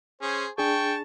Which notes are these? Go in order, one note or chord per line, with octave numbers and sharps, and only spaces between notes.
C#4 G#4 C5
D4 G#4 G5 A5 C#6